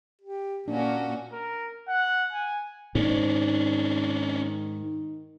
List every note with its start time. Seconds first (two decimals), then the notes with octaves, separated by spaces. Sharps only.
0.21 G4
0.68 A#2 A#3 C#4 D4 F#4
1.32 A#4
1.88 F#5
2.33 G#5
2.95 G#2 D#3 C#4 D4